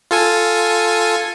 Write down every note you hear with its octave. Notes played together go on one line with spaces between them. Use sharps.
F4 A4 G#5